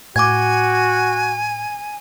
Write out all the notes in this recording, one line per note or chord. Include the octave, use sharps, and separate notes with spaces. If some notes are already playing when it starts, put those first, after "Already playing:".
A2 F#4 G#5 D6 G#6